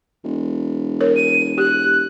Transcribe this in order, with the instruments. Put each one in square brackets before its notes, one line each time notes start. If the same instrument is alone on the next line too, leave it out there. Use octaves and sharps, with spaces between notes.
[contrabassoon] E1
[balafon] A#4 C#5
[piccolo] D#7
[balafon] G4 [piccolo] F#6